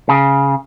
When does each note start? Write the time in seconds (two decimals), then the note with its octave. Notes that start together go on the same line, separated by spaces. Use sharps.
0.09 C#3